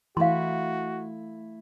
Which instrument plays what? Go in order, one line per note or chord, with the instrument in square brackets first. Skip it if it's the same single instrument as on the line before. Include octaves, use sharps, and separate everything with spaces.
[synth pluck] E3 [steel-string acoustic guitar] A3 E4 [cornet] F#4 [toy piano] F5 C6